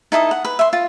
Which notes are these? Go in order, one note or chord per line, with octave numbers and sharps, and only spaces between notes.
D#4 E4 A4 D#6
F#5
B4
E5 C6
F4